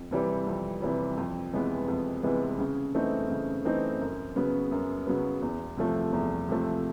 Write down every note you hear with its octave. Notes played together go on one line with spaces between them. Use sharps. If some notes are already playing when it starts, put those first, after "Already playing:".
Already playing: F2
C3 E3 G3
F2
C3 E3 G3
F2
C3 E3 G#3 B3
F2
C3 E3 G#3 B3
C#3
E3 A3 C4 D#4
C#3
E3 A3 C4 D#4
F#2
C#3 F#3 B3
F#2
C#3 F#3 B3
E2
C3 F3 A3
E2
C3 F3 A3